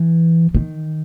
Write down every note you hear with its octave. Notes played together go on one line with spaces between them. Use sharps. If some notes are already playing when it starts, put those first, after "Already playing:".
Already playing: E3
D#3